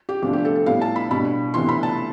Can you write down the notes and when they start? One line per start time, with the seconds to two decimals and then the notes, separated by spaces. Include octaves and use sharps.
0.09 G4
0.22 D2 C3 F3 B3 D4 G4
0.33 G4
0.45 A4
0.56 A4
0.66 A2 G3 B3 E4 F5
0.81 A5
0.96 B5
1.11 B2 G3 D4 B5
1.54 D2 C3 E3 B3 C6
1.69 B5
1.83 A5